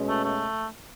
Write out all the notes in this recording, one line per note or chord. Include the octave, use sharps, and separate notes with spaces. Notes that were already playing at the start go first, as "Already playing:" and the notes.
Already playing: B2 G#3 C#4
A3
A3